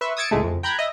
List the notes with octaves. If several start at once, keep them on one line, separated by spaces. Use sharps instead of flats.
B4 E5 C6 C#6
D#6 E6 G#6 A6 C#7 D7
C#2 A2 G#3 A3
F2
G5 A#5 B5 F#6 G#6
D#5 E5